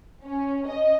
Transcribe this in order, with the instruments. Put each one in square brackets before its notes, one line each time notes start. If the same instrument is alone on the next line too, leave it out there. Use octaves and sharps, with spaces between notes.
[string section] C#4
D#5